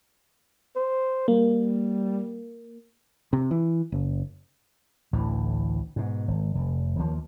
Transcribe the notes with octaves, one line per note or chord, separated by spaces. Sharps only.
C5
G3 A#3
C3
E3
F#1
A1 D2 A2 E3
G#2 B2
G#1
F1
D#2 F3 A#3